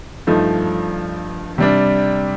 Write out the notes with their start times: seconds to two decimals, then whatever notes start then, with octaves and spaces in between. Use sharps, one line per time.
0.27 G2 F3 A3 D#4
1.58 C3 G3 D4